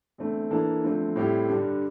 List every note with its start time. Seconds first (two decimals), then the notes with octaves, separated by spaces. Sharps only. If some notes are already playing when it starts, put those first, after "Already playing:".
0.18 E2 D3 A3 C4
0.50 E3 A#3 D4 A4
0.84 E2 D3 F3 A3 C4
1.16 A2 G3 C4 E4 G4
1.49 G2 D3 G3 D4